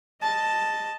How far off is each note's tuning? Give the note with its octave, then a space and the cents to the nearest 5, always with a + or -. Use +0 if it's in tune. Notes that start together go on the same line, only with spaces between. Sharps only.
D#5 +0 A5 +0